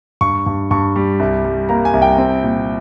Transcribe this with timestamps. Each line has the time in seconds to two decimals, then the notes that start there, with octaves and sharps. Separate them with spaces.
0.21 G2 C#6
0.46 G2
0.71 G2 C#6
0.96 G3
1.20 C2
1.45 G3
1.69 A#3 A#5
1.85 G#5
1.93 C2
2.02 G5
2.18 C4
2.44 A#2